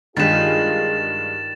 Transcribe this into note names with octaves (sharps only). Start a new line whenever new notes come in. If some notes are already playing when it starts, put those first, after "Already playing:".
G2 D#3 G#3 F4 G#4 B4 A6 E7